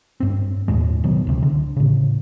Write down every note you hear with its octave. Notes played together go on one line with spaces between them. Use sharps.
G2 C4
D#2 A2 G#3
B2 D#3 F#3 B3
C#2 C3
D3
A2 C#3